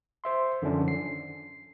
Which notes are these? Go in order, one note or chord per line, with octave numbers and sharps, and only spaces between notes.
C5 E5 C6
F#2 D3 D#3 F3 C#4 D4
C7